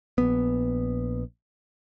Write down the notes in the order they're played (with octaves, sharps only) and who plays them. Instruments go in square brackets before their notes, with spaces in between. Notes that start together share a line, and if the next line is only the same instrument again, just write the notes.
[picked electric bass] A#1 B3